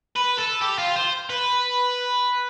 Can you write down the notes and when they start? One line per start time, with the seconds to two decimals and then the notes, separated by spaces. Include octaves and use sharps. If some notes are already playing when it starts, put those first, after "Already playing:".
0.16 B4
0.38 A4
0.61 G4
0.78 F4
0.96 C5
1.30 B4